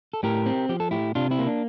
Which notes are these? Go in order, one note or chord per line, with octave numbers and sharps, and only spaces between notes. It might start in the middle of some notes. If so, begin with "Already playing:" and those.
A4
A2 G4 A#4
C4
F3 G4
A4
A2 E4 G4
C3 D4 F4
C4 E4
A#3
D4